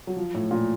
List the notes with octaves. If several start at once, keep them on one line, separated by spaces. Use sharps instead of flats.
F#3
F3
A2
A#2